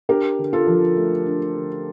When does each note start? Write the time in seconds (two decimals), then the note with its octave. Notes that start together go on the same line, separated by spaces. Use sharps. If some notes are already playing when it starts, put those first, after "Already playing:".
0.09 D4 G4 A#4
0.39 D3
0.53 F4 A4
0.67 F3
0.97 A3
1.26 D4
1.55 D3